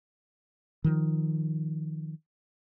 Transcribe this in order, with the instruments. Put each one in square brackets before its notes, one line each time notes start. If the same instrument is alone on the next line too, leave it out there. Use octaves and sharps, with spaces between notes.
[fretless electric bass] D#3 F3